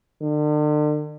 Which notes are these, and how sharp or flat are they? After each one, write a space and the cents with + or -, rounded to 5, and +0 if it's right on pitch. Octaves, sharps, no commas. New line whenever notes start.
D3 +40